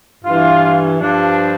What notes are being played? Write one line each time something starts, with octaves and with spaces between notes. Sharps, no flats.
G2 E3 F4
G2 F3 D4